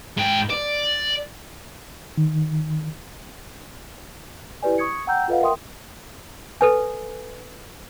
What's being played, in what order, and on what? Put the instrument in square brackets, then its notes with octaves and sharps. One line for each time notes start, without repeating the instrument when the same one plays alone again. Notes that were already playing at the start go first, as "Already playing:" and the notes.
[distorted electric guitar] G#2 G5
D5
[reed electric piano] D#3
[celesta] E4 G4 B4 D5 G#5
C#6 D#6 G#6 C#7
F#5 G5 A#5 E6 G6
F4 A4 B4 D#5 F5 F#5
A#4 E5 G5 C6 D#6
[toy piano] A4 B4 G#5